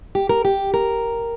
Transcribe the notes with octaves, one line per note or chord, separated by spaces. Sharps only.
G4
A#4
G4
A#4